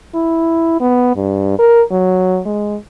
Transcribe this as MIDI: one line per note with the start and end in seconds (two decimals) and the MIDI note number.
0.15 0.75 64
0.80 1.12 59
1.16 1.58 43
1.59 1.82 70
1.91 2.40 54
2.46 2.76 56